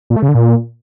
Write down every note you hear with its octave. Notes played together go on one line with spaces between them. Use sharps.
A#2
A3
C#3
D3
A#2